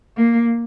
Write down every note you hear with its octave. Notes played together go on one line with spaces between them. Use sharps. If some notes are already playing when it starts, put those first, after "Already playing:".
A#3